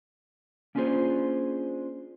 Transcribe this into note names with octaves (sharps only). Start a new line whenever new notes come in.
A#3 C#4 D4 F4 G#4 C5